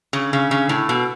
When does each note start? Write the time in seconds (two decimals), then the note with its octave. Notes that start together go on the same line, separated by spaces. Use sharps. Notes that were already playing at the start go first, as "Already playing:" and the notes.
0.13 C#3
0.33 C#3
0.51 C#3
0.69 A2
0.89 B2